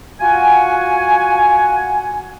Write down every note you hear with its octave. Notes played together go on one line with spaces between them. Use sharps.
F4 F#4 F#5 G#5